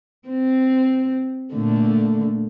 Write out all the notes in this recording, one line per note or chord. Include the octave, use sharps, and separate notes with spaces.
C4
A#2 D3 A3